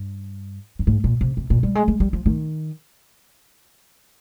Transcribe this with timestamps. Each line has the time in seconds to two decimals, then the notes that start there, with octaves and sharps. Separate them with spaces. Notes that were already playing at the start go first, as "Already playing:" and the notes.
Already playing: G2
0.79 G2
0.87 G#2
1.04 A#2
1.21 C3
1.37 C3
1.50 A#2
1.63 G3
1.75 G#3
1.88 G#3
2.00 G3
2.13 F3
2.26 D#3